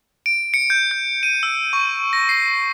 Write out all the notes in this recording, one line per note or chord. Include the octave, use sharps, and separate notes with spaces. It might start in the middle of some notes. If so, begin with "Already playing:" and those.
D7
C#7
G6
G6
D#7
E6
C#6
A#6
C7